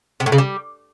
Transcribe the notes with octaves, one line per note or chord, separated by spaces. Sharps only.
C3
A2
C#3
G3